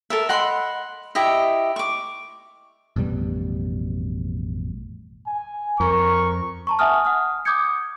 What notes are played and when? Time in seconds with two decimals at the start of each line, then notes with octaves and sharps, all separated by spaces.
0.10 A4 A#4 E5
0.29 D#5 F#5 B5 C6
1.15 E4 G4 D#5 E5
1.76 C#6 D6
2.96 A1 F2 B2 G3
5.26 G#5
5.80 F2 A#4 C#6
6.67 A5 A#5 C#6
6.79 E5 F#5 G#5 A5 D#6 F6
7.05 F#5 D#6 F6
7.45 D6 D#6 G6 G#6 C#7